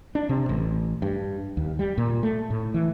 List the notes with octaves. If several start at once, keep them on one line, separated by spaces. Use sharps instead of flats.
D4
C3
A1
G2
D#2
G3
A#2
A3
A2
E3